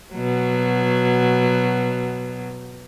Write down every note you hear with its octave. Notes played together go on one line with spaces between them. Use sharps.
B2 F#3